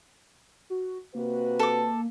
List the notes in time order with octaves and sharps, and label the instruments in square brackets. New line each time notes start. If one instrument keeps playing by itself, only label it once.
[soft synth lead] F#4
[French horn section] C3 F#4 B4 [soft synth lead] A#3
[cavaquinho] A4 D6